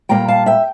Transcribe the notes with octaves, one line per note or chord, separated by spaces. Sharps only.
A#2 G3 A#3 G5 A#5
F5 A5
E5 G5